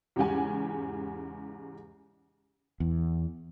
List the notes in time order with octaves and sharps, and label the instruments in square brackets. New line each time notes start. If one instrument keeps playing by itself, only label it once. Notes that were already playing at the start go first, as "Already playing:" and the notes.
[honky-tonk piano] E2 G#2 C#3 G4 F#5 G#5
[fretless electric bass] E2